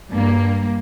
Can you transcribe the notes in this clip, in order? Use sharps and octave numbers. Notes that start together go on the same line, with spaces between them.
G2 A#3